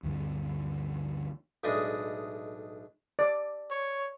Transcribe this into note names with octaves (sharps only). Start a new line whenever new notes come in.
D2 G2 E3
B1 A2 G#3 D4 D#5
D5
C#5